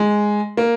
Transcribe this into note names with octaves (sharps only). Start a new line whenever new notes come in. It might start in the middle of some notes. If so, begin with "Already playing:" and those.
Already playing: G#3
A#3